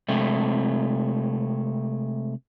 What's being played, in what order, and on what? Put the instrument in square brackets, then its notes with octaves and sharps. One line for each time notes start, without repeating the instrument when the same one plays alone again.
[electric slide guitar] C3 G#3 A3 C4